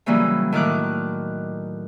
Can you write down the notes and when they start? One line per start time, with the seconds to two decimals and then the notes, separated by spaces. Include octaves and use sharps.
0.06 C#3 E3 F#3 G3 A#3 C#4
0.52 A2 D#3 A#4 D6 F#6